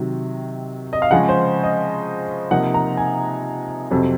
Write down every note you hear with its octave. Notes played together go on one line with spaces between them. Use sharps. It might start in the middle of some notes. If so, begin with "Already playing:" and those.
Already playing: C3 D#3 F#3
D#5
F5
C#3 F3 G#3 C#4 F#5
C5
D#5
C3 F3 A#3 D#4 F#5
A#5
G#5
F2 C3 F#3 C4